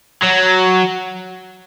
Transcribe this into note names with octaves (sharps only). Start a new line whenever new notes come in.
F#3